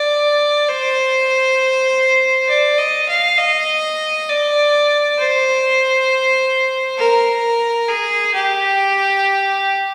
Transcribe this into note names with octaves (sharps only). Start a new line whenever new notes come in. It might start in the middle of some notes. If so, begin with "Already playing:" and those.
Already playing: D5
C5
D5
D#5
F5
D#5
D5
C5
A#4
G#4
G4